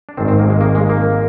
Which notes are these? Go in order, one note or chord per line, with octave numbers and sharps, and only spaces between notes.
D4
G#1 G#2 D#3 C4
C4
A#3
G#3
A#3
G#3
A#3